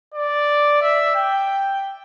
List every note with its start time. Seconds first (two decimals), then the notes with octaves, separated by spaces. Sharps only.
0.14 D5
0.81 E5
1.15 G5